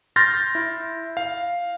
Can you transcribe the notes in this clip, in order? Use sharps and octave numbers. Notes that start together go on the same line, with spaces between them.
C6 F6 G6 A6 A#6
E4
F5